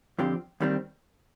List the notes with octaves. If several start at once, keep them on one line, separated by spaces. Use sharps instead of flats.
F2 D3 F3 C4 G4
D#2 D#3 G3 C4